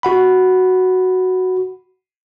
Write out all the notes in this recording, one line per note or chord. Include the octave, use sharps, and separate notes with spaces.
F#4 F#5 B5